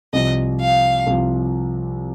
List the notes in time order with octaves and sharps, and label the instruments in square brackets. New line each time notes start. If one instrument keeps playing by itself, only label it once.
[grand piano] C2 C3 F3 [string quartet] D#5
[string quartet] F5
[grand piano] C2 C3 F3